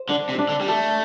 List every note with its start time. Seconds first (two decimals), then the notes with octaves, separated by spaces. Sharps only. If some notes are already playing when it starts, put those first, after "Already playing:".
Already playing: C5
0.09 D3 D4
0.29 C3
0.39 D4
0.49 D3
0.61 G3
0.68 A3 A4